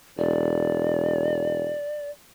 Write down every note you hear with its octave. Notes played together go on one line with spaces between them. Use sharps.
E1 D5